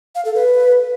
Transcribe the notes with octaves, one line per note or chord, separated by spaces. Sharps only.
F5
A4
B4